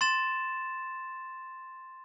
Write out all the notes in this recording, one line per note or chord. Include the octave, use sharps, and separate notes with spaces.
C6 A6 E7